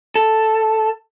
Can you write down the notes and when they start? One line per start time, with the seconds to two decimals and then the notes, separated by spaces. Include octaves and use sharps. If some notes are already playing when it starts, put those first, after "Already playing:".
0.15 A4